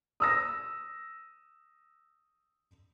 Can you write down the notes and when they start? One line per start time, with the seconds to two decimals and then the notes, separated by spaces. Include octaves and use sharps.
0.20 D#6 E6 A#6